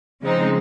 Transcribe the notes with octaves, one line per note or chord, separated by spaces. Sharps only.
C#3 F3 G#3 C4 D#4